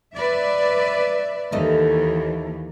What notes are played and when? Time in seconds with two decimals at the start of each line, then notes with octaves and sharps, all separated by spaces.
0.16 B4 D5 E5
1.52 D#2 E3 A3 D#4 A4